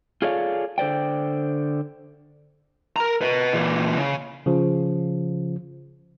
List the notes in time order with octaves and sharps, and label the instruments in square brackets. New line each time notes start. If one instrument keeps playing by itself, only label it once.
[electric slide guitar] F4 G#4 A4 C#5 D5 F5
D3 C5 D5 G5
[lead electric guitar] A#4 A#5
B4 D#5
A#2 E3
C#3
[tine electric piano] C#3 F3